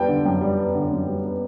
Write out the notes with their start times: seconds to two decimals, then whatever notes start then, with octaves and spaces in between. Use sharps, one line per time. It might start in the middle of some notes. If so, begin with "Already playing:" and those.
Already playing: G3 B3 G5 A5
0.08 D3
0.25 F#2 G5
0.41 G3
0.57 B3
0.75 D3
0.91 F#2
1.07 G3
1.25 B3